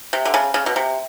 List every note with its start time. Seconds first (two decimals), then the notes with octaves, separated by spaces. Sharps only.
0.13 C3
0.25 D3
0.34 C#3
0.54 C#3
0.66 B2
0.76 C3